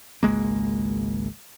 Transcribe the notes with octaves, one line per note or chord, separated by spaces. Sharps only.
G#1 C#2 G#3 A#3